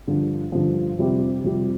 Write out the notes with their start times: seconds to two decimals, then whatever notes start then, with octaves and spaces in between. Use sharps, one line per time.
0.07 G2 D3 F3
0.52 G2 D3 F3
0.99 F2 C3 G3 C4 G4
1.44 F2 C3 G3 C4 G4